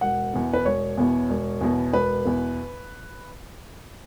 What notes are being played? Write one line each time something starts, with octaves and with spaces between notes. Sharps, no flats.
E1 F#5
E2 B2 B3
B4
E1 C#5
E2 B2 B3
E1
E2 B2 B3
E1 B4
E2 B2 B3